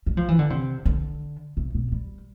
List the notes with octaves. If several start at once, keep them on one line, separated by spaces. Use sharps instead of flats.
G3
F3
E3
D3
C3
D3
C3
B2
G3